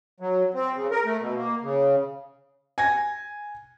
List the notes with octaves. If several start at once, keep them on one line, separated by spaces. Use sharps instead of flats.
F#3
C4
C#3
A#4
A3
B2
A#3
C#3
G#5 G#6 A#6